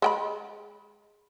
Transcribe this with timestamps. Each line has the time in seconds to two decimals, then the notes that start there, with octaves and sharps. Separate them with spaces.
0.02 G#3 G5 B5